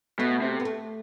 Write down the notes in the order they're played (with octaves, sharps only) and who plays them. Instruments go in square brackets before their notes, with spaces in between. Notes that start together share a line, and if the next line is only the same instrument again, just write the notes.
[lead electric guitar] B2 [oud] A3
[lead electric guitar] C3
[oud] B3
A3